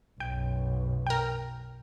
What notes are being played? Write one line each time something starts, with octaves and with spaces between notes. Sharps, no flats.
B1 F#2 G5
A#4 G5